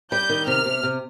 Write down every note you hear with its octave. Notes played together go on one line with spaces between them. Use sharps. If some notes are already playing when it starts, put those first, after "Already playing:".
G3 G6
D#3
C3 F6
C3
C3